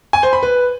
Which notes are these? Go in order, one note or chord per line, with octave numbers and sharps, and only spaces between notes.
G#5
C5
B5
B4